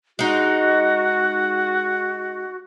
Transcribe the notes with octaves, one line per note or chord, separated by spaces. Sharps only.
G#3 D#4 F#4